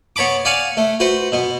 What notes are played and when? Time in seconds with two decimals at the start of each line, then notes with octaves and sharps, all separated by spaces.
0.16 B3 C#5 A5 B5 D6
0.45 D5 F5 F#5 G#5
0.77 A3
1.00 F#4 B4 C5
1.32 B2 B3